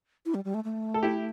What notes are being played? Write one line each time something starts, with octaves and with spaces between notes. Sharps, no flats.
E4
G3
G3
A3
A3
A4
E4 G4